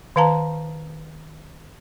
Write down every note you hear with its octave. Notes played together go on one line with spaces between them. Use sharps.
D#3 B4 F5 A5 A#5